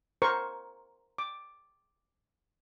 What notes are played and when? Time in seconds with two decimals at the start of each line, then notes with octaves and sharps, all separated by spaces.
0.22 A#4 C5 C#6
1.18 D6